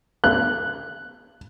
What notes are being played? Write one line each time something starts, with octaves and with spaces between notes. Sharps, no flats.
F#6